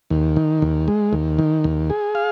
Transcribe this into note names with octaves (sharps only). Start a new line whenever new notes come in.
D#2
D#3
D#2
G#3
D#2
D#3
D#2
G#4
F5